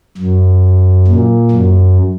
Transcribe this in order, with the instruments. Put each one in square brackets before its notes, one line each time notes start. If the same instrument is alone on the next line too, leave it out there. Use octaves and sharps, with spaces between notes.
[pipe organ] F#2
A#2
F#2